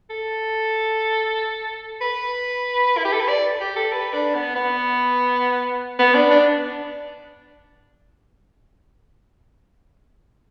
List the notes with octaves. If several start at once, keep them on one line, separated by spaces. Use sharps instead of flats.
A4
B4
E4
G4
A4
B4
D5
G4
A4
B4
D4
B3
B3
B3
D4
D4